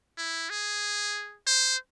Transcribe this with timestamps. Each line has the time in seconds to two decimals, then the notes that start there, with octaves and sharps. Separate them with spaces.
0.18 E4
0.50 G#4
1.47 C5